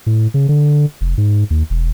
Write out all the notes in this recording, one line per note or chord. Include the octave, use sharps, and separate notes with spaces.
A2
C#3
D3
F1
G#2
D#2
E1